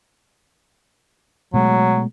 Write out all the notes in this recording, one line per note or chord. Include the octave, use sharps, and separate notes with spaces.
B2 F#3 G#3 A3